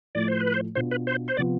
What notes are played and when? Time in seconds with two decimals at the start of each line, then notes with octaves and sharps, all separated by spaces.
0.15 A2 F3 A3 D5
0.28 C5
0.40 B4
0.54 C5
0.75 B2 B3 D4 F4 C5
0.91 B4
1.07 C5
1.28 C5
1.37 C3 F3 B3 F4 D5